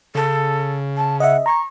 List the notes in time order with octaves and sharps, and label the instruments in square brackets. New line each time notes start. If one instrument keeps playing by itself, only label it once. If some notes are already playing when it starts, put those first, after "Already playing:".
[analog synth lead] C#3 [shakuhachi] A4
[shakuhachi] A5
[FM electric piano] D#5 E5 [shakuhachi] F#5
[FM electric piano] A#5 [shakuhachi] C#6